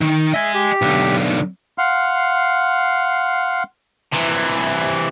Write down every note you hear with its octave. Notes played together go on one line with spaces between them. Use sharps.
D#3
D#5 E5 G#5
G4
B1 D3
F5 F#5 C6 F6
C3 E3